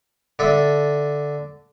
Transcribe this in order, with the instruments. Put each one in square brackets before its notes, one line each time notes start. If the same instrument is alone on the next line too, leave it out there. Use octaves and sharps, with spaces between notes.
[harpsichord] D3 A4 E5